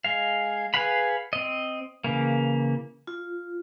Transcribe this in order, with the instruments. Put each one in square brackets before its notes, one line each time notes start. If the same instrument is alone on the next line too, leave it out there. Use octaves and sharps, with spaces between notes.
[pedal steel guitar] G#3 F5
G#4 B4 F5 F#5 B5
C4 D#5
C#3 E3 A#3
[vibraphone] F4